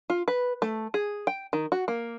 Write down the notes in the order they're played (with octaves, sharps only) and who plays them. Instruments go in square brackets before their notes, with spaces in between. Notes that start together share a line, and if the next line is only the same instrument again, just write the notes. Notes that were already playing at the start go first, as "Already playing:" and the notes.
[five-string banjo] F4
B4
A3
G#4
G5
D#3
F#4
A#3